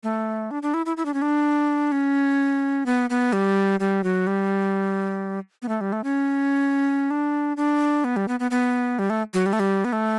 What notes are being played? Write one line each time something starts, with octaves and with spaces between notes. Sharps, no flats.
A3
D4
D4
E4
E4
E4
D4
C#4
D4
C#4
B3
B3
G3
G3
F#3
G3
B3
A3
G3
A3
C#4
D4
D4
B3
G3
B3
B3
B3
G3
A3
F#3
G3
A3
G3
B3
A3